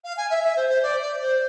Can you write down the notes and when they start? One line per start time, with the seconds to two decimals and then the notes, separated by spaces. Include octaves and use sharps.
0.04 F5
0.17 G#5
0.30 E5
0.43 E5
0.56 C5
0.69 C5
0.82 D5
1.01 D5
1.21 C5